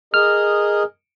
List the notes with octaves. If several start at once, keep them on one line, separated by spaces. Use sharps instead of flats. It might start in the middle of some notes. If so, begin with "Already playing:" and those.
G#4 A#4 D#5 F6